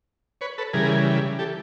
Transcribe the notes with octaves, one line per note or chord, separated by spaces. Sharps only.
B4 C#5
A4 B4
C#3 E3 G3 G#4 A#4
G4 A4